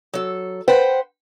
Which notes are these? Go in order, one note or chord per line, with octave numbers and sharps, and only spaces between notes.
F#3 A4
B4 C5 F#5 G5